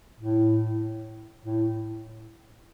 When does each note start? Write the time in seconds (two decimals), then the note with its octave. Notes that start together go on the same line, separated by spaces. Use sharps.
0.20 A2
1.43 A2